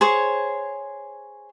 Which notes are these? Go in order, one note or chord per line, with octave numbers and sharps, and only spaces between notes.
G#4 C5 C#5